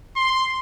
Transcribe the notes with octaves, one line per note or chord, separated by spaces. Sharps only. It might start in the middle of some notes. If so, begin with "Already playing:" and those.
C6